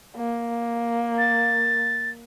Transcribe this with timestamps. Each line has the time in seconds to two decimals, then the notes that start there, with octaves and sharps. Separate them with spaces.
0.17 A#3
1.18 A6